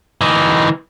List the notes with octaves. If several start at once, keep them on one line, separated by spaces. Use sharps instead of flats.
E3 D#4